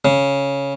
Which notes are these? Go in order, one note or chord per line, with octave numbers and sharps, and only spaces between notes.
C#3